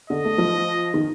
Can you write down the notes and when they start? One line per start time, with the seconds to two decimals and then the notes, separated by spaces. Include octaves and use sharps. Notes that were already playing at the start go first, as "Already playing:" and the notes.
0.10 D3 D#5
0.25 A3
0.38 F3
0.94 D#3